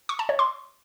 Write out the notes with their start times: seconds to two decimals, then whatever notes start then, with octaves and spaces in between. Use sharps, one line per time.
0.09 C#6
0.19 A5
0.29 C#5
0.39 C6